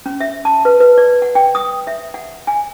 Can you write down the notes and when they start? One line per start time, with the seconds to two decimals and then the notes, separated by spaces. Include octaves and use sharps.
0.06 C#4
0.21 E5
0.45 A5
0.65 B4
0.80 B4
0.98 D5
1.22 F#5
1.35 G5
1.55 D#6
1.87 E5
2.14 F#5
2.47 G#5